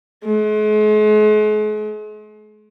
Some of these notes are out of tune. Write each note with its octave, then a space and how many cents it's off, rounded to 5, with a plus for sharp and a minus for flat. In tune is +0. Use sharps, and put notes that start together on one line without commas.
G#3 +40